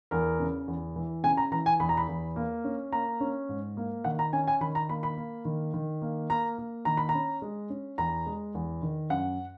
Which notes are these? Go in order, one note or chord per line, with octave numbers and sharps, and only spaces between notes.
E2 A#4
C#3
E2
E3
C#3 G#5
A#5
E3 A#5
G#5
E2 B5
A#5
B5
E2
A#3
C#4
A#3 A#5
C#4
G#2
A#3
D#3 F#5
A#5
C#4 G#5
G#5
D#3 B5
A#5
A#3 B5
B5
A#3
D#3
D#3
A#3
A#3 A#5
A#3
D#3 A#5
B5
A#5
C#4
G#3
C#4
E2 A#5
G#3
E2
D#3
F#2 F#5